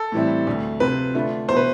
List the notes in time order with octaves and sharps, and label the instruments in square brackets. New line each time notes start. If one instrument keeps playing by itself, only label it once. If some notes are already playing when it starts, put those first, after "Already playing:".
Already playing: [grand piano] A4
[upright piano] A2 E3 G3 C4 E4
D2 D3 A3
[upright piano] C3 F3 C4 F4 [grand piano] B4
[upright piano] D3 A3 D4 F4
[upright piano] E2 B2 B3 E4 [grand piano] C5
[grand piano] B4